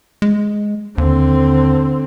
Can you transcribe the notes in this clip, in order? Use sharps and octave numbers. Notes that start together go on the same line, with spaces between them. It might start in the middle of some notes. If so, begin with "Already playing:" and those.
G#3
D#2 D3 C4